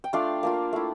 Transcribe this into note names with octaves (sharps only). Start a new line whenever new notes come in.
G5
A3 D4 F4 D5 F5
A#3 D4 F4
A3 E4